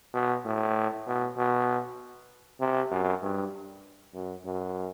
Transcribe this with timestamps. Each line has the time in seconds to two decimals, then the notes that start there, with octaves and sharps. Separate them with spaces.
0.14 B2
0.45 A2
1.07 B2
1.37 B2
2.60 C3
2.91 F#2
3.23 G2
4.14 F#2
4.45 F#2